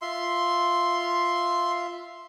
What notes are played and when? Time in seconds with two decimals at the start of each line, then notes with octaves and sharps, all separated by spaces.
0.02 F4 E5 C6